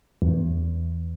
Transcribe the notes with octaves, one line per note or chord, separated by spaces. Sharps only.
E2